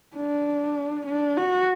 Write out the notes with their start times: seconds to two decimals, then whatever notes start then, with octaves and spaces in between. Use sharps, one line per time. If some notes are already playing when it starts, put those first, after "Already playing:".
0.17 D4
1.07 D4
1.37 F#4